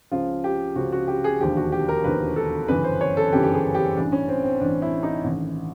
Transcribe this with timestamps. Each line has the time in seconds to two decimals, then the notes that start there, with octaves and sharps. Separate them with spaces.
0.11 C#2 C#3 F3 F4
0.44 G4
0.76 C#2 C#3 F3 F#4
0.92 F#4
1.08 G4
1.24 G#4
1.40 E1 D#2 D3 F3 G4
1.57 F#4
1.72 G4
1.89 A#4
2.04 E1 D#2 D3 F3 B4
2.36 A4
2.68 G1 F#2 C#3 E3 B4
2.84 C5
3.01 C#5
3.17 A4
3.33 G1 F#2 C#3 E3 G4
3.43 G4
3.53 G#4
3.75 G4
3.96 A1 G2 E3 D4
4.12 C#4
4.29 C4
4.44 C4
4.60 A1 G2 E3 D4
4.82 E4
5.03 D#4
5.24 A1 G2 D#3